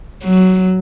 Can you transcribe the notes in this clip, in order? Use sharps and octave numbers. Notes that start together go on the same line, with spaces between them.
F#3